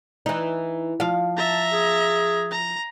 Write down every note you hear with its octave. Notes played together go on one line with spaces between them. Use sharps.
E3 D#4
F3 F5
E5 A5 A#5
G#4
A#5